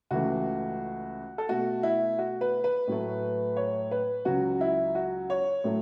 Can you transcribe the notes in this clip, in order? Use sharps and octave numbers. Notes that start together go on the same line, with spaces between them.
C#2 C#3 E3 A3 F#4
A4
B2 A3 F#4
E4
F#4
B4
B4
A2 F#3 A3
C#5
B4
C#2 C#3 F#3 F#4
E4
F#4
C#5
A2 F#3 A3